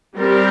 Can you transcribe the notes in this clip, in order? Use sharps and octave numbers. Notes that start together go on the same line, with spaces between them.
G3 C4 G4 A#4